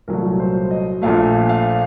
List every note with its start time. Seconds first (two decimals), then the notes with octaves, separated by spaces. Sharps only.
0.08 C2 A#2 F#3 A3 A#4
0.40 C5
0.71 D#5
1.02 A#1 A#2 A3 F5
1.49 F5